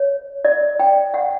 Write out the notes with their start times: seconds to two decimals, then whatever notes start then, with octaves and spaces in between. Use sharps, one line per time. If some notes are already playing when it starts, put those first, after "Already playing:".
Already playing: C#5
0.45 D5
0.79 G5
1.14 F#5